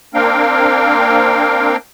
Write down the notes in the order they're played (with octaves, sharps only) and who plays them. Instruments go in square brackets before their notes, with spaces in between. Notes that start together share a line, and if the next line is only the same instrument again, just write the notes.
[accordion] A#3 C4 D4 A#4 F5 G5